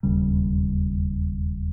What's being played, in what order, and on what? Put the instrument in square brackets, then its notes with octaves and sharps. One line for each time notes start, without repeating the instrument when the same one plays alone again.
[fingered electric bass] E1 D#2 C#3 G3